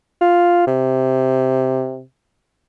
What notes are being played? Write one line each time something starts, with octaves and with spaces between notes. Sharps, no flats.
F4
C3